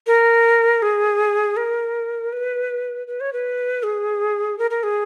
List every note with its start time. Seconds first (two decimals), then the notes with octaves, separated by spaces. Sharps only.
0.07 A#4
0.82 G#4
1.57 A#4
2.33 B4
3.07 B4
3.20 C#5
3.33 B4
3.83 G#4
4.59 A#4
4.70 A#4
4.83 G#4